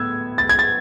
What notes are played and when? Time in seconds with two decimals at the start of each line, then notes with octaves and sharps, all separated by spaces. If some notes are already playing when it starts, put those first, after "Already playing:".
Already playing: A2 B3 E6 G#6
0.38 A6
0.49 G#6
0.59 A6